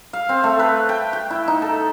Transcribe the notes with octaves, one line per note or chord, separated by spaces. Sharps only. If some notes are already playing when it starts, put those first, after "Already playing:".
F5
C4
A3
B4
G5
G5
E4
D#4
A4